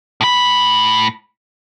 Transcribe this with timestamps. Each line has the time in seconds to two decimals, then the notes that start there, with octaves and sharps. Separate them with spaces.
0.21 A2 B5